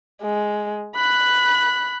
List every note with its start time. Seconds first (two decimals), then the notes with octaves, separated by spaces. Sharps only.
0.22 G#3
0.96 B5 F#6